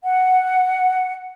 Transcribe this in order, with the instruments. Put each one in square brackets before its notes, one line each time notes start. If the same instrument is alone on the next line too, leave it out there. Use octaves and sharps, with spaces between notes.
[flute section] F#5